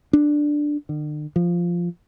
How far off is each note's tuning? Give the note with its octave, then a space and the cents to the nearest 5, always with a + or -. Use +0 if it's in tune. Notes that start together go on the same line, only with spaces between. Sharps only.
D4 +5
D3 +45
F3 -5